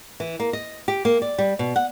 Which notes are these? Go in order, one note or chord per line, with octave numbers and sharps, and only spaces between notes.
E3
A#3
D#5
G4
A#3
D5
G3
B2
F#5